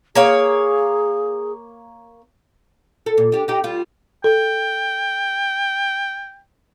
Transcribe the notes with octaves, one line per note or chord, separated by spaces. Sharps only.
A#3 G#4 C#5 F5
A4
A#2
D4 G4
D#4 G4
G3 F4
A4 G5